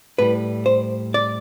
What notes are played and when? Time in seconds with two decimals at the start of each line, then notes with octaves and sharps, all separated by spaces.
0.18 A2 G3 B4
0.66 C5
1.14 D5